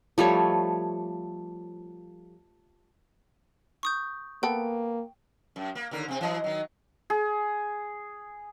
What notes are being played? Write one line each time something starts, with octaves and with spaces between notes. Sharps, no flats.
F3 G3 A3 C#5
C#6 D#6 G6
A#3 B3 A4 G5
F#2
A#3
D#2 D3 A#4
C3 C4
E3 F#3 D#5
D#3 F#3
G#4